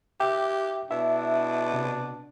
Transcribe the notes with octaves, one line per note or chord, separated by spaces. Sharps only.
G4 E5 G5 D6
B2 D4 E4 E5
C3